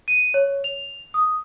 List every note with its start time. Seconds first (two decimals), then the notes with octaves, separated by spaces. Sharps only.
0.08 D#7
0.34 C#5
0.64 F7
1.14 D#6